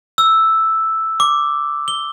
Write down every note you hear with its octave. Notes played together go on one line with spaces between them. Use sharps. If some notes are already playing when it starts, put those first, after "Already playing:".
E6
D6
G7